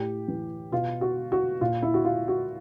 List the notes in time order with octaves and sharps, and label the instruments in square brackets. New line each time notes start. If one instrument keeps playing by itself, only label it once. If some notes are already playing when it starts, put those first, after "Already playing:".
Already playing: [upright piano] A2 G4
E3
B2 F4
F#4
F#4
A#2 F4
E4
F#4
F4
F#4